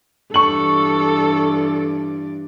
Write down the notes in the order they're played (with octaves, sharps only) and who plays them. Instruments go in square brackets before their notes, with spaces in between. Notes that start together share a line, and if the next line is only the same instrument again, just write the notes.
[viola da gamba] G2 E3 D5 [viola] A4 [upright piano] C#6 F#7